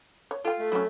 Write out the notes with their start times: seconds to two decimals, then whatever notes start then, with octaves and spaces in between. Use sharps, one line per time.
0.31 C#5
0.45 F4 A4 G5
0.59 A3
0.72 F#3 C#4 E4